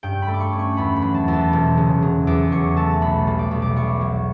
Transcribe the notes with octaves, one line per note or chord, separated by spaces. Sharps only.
G2 G5
B5
A3
D6
C#6
C#4
C#6
E2 B5
B5
F#3
A5
E2
A5
E1
C#3
F#3
E2 D6
F#3 C#6
A3 A5
B1 B5
G3
D6
B1
D6
B1 C#6
F#3